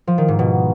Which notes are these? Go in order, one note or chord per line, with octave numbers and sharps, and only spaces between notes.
F3
D#3
G#2
B2